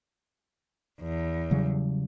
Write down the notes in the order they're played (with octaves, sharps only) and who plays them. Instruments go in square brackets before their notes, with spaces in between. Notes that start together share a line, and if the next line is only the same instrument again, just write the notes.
[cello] E2
[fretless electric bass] C#3 F#3 G3